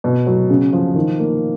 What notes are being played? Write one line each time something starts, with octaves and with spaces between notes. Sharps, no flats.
B2
F#3
C#3
F3
D#3
A#3